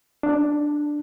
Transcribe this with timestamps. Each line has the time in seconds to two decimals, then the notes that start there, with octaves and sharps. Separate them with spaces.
0.23 D4